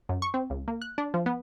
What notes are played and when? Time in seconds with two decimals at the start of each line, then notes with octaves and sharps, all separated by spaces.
0.09 F#2
0.22 C#6
0.34 C4
0.50 C#2
0.68 A#3
0.82 F#6
0.98 D4
1.14 F3
1.26 B3